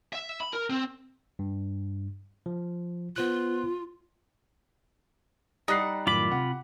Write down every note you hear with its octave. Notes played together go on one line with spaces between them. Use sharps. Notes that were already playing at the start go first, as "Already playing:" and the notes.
E5
B5
A#4
C4
G2
F3
B3 F4 C5 F#6
G3 D#4 F#5 F#6 C7
F#2 A2 D#3 F4 B5 D6
C3 F#5